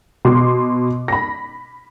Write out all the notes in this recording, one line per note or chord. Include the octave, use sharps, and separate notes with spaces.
B2 C6 D6
B5 A#6